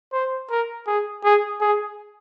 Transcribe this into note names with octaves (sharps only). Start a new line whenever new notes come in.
C5
A#4
G#4
G#4
G#4